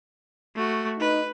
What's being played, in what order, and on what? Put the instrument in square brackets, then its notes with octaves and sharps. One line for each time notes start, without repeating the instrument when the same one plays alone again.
[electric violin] A3 F#4
[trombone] D#4 [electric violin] B4